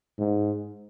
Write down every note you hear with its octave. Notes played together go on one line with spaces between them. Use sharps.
G#2